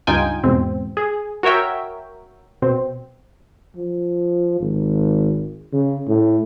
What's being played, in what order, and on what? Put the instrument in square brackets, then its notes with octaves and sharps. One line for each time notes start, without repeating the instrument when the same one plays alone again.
[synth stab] C#2 G2 D#4 F4 G5 G#5
E2 G#2 B2 C4
G#4
F#4 A#4 C#5 E5 G5
B2 C4
[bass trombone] F3
G#1
C#3
A2